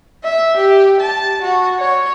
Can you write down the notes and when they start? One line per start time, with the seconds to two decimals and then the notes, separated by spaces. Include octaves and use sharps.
0.25 E5
0.57 G4
1.01 A5
1.43 F#4
1.80 C#5